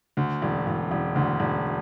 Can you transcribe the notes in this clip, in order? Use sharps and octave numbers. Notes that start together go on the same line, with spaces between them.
D2
E1
E1
E1
D2
E1